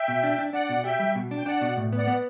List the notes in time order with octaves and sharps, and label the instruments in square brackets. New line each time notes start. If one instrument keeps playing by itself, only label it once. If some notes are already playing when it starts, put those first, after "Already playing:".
Already playing: [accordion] E5 G5
[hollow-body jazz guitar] B2
D4
D4
[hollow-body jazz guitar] D4 [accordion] D5 F#5
[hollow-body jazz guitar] B2
[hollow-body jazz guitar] G4 [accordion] E5 G5
[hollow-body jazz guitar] G3
B2
D4
[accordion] G5
[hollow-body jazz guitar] D4 [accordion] D5 F#5
[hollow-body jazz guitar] B2
A2
[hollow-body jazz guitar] B3 [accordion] D5 F#5
[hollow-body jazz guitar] B3